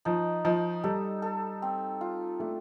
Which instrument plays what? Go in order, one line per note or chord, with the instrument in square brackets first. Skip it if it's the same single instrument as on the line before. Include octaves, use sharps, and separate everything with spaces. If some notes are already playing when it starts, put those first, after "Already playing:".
[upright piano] F3 [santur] D#4
[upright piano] F3 [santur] D#4
[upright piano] G3 [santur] A4
[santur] A4
C4
F4
[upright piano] A3 [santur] D4